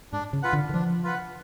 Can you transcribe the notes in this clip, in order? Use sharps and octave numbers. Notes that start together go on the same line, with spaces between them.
G#2 D4
C#3
F4 B4 F#5
D3
D3
F3 D4
F4 B4 F#5